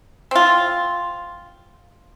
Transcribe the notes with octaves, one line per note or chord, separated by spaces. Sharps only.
C4 F4